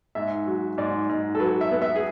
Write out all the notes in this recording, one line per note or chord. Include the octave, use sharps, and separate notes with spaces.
G#2 E5
F#3
G#2 D5
G#2
A4
F#3 B4
E5
B3
E5
G#4